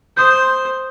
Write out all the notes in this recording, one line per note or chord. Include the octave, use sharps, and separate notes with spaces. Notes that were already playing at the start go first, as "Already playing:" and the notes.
C5 D#6 G6